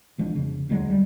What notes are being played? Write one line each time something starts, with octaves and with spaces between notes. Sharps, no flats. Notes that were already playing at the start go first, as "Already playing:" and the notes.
B1 F3 G#3 D4
F2 C#3
E1 D2 F#3 G#3
G3